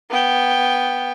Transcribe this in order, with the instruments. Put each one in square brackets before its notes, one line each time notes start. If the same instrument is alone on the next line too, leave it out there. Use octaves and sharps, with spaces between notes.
[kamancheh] B3 G5